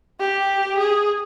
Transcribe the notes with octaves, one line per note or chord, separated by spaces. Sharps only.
G4
G#4